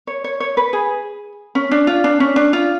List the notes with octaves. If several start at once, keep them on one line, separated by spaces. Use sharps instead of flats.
C#5
C#5
C#5
B4
G#4
C#4
D4
F4
D4
C#4
D4
F4